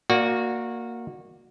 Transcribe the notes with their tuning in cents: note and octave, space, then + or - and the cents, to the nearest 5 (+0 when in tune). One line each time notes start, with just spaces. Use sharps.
A#3 +0 F#4 -20 D5 +0